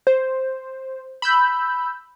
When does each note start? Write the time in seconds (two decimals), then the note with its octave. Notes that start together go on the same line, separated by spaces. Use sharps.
0.07 C5
1.22 B5 E6 G6